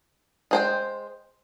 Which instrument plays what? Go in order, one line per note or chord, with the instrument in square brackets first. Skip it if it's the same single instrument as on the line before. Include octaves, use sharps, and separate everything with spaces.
[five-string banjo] G#3 C5 G5